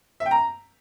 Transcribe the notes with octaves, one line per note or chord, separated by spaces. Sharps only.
E5
G5
A#5